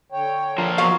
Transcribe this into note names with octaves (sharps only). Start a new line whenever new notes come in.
D3 C#5 G5
F3 A#4
F#3 B3 F5